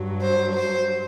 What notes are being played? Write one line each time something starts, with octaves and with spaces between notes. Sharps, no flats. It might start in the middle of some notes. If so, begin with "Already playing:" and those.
Already playing: G2 F#3
C5
C5